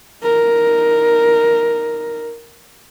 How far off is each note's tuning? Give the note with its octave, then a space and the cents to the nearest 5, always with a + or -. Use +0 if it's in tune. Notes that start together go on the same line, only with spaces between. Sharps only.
D#4 +0 A#4 +0